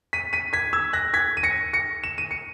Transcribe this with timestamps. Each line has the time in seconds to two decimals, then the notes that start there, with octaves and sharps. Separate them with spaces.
0.13 B6 D#7
0.33 B6 D#7
0.53 G#6 B6
0.73 E6 G#6
0.93 F#6 A#6
1.14 G#6 B6
1.37 D#7
1.43 A#6 C#7
1.73 A#6 C#7
2.04 E7
2.18 D#7
2.31 C#7